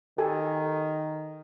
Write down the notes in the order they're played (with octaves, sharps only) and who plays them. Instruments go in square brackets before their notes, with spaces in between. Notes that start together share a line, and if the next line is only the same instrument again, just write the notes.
[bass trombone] D#3 [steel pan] G4 A4 G#5